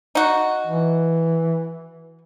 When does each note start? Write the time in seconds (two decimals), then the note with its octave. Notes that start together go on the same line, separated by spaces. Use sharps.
0.15 D#4 F#4
0.67 E3